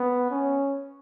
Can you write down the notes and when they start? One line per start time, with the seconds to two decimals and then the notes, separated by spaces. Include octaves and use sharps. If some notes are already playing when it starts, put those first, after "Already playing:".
Already playing: B3
0.30 C#4